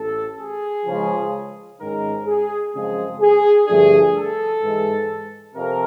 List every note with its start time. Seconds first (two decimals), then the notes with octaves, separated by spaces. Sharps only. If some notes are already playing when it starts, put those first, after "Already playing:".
Already playing: A1 A4
0.38 G#4
0.86 C#2 C#3 F3
1.79 G#2 D#3 G#3 C#4 A#4
2.26 G#4
2.73 F#2 C#3 F3 G#3 C4 G#4
3.21 G#4
3.67 G2 D3 F3 A3 D4 G#4
4.15 A4
4.62 G#2 E3 G#3
5.55 F2 C3 A#4